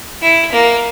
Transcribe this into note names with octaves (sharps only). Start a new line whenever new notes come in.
E4
A#3